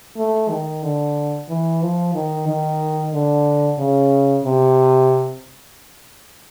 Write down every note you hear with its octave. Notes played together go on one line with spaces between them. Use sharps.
A3
D#3
D3
E3
F3
D#3
D#3
D3
C#3
C3